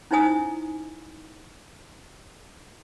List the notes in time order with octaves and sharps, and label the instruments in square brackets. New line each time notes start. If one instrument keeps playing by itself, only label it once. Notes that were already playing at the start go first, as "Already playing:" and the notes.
[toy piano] C#4 D#4 E4 C5 G#5 D#6